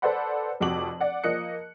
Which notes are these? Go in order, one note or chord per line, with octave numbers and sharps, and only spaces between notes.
A4 B4 C5 D5 F#5 B5
F1 F2 F#4 D6 F#7
D5 F#5
F3 A#3 D#5 F#6 C#7